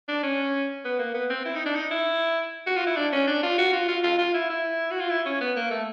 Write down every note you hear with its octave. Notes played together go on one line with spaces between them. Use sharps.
D4
C#4
B3
A#3
B3
C4
E4
D#4
D4
D#4
E4
F#4
F4
E4
D4
C#4
D4
F4
F#4
F4
F4
F4
F4
E4
E4
F#4
F4
E4
C#4
B3
A#3
A3